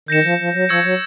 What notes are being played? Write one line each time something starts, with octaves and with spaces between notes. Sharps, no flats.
D#3 G6 A#6 C#7 E7
F3
F3
F#3
F3 C#6 E6 G#6 C#7
F#3